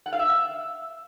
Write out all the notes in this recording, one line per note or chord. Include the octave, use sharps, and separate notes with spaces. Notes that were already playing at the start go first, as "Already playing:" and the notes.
F#5
F5
E5